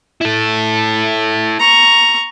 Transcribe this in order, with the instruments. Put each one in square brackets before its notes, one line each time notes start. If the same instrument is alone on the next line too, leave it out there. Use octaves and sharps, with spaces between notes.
[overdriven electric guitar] E4 A4
[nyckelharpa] A#5 C#6